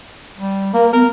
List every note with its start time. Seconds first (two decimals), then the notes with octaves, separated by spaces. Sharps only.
0.38 G3
0.73 A#3 A#4
0.93 B3 A#4